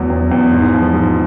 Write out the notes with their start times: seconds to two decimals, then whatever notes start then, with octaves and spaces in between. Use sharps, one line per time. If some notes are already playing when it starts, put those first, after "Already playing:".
Already playing: E2 F#3
0.10 E2
0.32 E2
0.53 G#2
0.74 F3
0.94 G#2